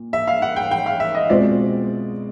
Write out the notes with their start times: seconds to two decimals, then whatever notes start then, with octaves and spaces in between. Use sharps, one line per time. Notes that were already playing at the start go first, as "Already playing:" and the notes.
Already playing: A#2
0.13 E5
0.27 F5
0.42 F#5
0.56 G5
0.71 G5
0.86 F5
1.00 E5
1.15 D#5
1.29 B2 G#3 C4 F4 D5